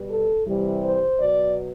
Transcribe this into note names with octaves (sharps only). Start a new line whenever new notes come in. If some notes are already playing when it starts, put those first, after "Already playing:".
Already playing: B2 G3
A4
C3 E3 G3
C5
B2 F#3 D5